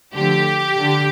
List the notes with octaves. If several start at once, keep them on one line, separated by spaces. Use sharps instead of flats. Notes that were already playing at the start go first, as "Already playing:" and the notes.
D3 F3 A3 G4
D3